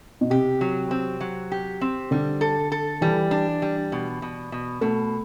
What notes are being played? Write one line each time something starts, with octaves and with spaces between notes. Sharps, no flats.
B2
C3 G4
F#3
C4
F#3
G4
C4
D3 G3
A4
A4
E3 G3
D4
G3
B2
B2
B2
B2 A3